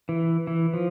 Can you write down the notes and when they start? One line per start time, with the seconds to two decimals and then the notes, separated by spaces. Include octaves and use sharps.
0.09 E3
0.47 E3
0.74 F3